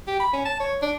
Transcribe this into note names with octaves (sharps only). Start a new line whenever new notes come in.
G4
B5
C#4
A5
C#5
D4